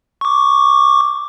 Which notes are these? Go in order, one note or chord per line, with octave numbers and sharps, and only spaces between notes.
C#6 D6